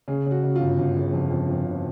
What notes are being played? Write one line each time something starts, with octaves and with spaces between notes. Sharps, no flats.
C#3 G#4
C#3 F#4
C#3
G1 F4
G1
C#3
F2
F2
F2
C#3